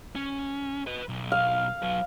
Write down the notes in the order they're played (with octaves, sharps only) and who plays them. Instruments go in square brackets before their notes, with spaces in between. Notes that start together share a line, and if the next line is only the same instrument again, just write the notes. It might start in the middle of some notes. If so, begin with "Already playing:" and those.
[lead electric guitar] C#4
B4 D#5
B1
[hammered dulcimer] F5
[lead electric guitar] F#3 B4